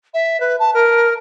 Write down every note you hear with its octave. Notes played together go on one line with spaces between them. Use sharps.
E5
B4
A5
A#4